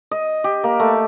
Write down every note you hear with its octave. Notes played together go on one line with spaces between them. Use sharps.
D#5
G4
A#3
A3